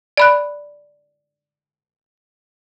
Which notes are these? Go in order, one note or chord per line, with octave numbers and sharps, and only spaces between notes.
D5 B5 F#6